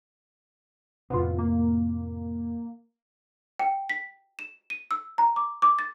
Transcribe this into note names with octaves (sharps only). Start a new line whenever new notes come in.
F2 A2 C3 B3 F4
A#3
G5
B6
E7
D#7
E6
A#5
D6
D6
A6